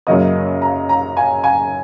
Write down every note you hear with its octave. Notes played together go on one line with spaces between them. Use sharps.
F#2 C#3 F#3 A#3 D#5
A#5
A#5
G#5
G#5